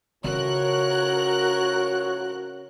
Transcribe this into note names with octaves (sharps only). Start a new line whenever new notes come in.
F2 A2 C#3 F#4 A#4 C#5 F#6